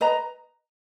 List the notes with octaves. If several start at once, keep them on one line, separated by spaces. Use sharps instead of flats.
B4 D#5 A#5